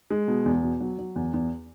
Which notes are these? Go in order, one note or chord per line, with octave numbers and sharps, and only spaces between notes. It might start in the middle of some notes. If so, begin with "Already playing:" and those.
G#3
B2
E2
B2
F#3
F#3
E2
E2